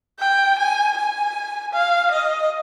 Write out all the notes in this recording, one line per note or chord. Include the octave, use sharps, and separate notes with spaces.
G5
G#5
G#5
F5
D#5